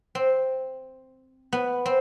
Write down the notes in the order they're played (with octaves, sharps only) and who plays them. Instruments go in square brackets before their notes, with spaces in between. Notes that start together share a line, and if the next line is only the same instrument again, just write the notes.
[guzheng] C4
B3
C4